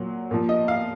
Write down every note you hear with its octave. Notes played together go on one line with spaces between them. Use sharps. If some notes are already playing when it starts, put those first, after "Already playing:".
Already playing: A#2 F#3
A#2 F3
D#5
F5